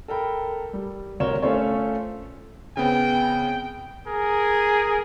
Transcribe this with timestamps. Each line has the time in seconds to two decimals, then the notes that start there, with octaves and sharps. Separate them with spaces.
0.08 A4 A#4 G5 B5
0.73 G3
1.20 D2 C3 A#4 C#5 E7 G7
1.42 A3 C#4 F4 A4 C5 C#5
2.77 C#3 B3 C4 G5
4.07 G#4 A#4